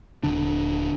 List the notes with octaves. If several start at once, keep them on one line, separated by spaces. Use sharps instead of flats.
D#1 D3 D4